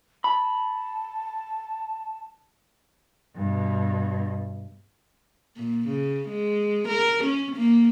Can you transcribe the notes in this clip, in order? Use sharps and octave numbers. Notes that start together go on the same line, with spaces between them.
A5 B5
G2 B2
A#2
C#3
G#3
A#4
C#4
A#3